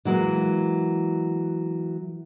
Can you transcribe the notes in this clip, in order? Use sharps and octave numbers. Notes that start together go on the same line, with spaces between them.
E3 F#3 G#3 A#3